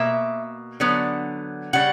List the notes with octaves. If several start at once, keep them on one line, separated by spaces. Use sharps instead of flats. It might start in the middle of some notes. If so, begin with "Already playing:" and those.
Already playing: B2 A#3 E5
D3 F#3 B3
C#3 G3 F#5